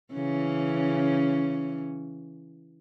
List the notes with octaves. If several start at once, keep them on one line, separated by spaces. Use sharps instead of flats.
C#3 E3 C#4